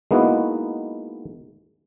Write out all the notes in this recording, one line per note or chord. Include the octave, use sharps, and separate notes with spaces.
G#3 A#3 B3 D#4 E4 F#4